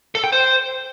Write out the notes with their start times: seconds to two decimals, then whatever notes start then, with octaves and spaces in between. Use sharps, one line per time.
0.15 A4
0.24 G5
0.32 C5